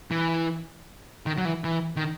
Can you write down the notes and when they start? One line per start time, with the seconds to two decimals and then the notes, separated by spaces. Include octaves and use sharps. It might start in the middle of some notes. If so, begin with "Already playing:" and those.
0.11 E3
1.26 D#3
1.38 F#3
1.45 E3
1.64 E3
1.96 D#3